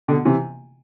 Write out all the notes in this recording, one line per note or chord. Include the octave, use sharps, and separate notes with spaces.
B2 D3
C3 E3